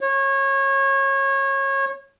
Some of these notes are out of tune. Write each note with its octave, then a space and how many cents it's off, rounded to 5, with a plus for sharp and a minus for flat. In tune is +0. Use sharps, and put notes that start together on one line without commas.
C#5 -25